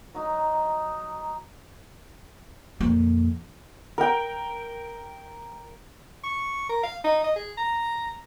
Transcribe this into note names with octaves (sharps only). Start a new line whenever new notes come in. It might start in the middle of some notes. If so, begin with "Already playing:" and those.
F#3 D#4
F2 A#2
A#4 G5
C#6
A#4
F5
D#4
D#5
G#4
A#5